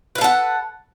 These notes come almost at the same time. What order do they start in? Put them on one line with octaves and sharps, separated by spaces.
B4 F5 A4 F#5